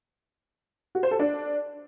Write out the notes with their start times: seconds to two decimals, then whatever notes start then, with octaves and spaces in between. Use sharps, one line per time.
0.95 F#4
1.03 C5
1.11 A4
1.19 D4